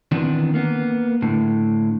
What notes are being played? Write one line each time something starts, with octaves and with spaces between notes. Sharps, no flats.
D#3 E3 B3 C4 D4
A#3 B3
A2 D3